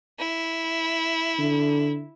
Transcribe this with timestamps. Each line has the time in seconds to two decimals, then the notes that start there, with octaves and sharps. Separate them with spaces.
0.19 E4
1.38 D3